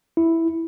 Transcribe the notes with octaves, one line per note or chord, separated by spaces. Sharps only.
E4